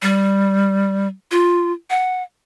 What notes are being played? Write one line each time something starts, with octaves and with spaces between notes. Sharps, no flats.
G3
F4
F#5